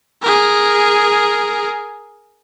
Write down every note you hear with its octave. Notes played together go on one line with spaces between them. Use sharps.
G#4 A#4